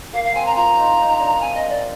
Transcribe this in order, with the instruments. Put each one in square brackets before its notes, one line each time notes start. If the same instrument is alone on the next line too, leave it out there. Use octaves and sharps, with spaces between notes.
[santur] A#3 [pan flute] F5
[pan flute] F5
[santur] C4 [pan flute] G#5
[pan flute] A#5
[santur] F4 [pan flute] A#5
[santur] D#4
D#4
D4
[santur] C4 [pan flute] G#5
[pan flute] D#5
D5